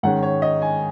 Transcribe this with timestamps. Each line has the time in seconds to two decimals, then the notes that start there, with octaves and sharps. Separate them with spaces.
0.03 G#2 D#3 G#3 C#4 F#5
0.23 C#5
0.42 D#5
0.62 G#5